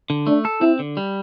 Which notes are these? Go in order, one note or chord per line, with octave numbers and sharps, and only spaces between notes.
D3
A3 D4
A4
C4 E4
D3
G3